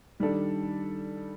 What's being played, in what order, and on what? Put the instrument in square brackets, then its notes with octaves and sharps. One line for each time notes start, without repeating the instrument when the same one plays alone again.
[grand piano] D#3 G3 D4 A4